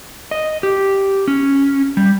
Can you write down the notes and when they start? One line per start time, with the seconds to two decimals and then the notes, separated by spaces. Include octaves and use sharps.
0.31 D#5
0.63 G4
1.28 C#4
1.97 G3